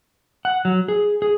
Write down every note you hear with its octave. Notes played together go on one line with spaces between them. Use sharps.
F#5
F#3
G#4
G#4